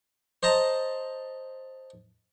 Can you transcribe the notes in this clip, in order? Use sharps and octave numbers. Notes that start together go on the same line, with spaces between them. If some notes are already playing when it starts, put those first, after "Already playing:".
C5 D#5 A5 A#5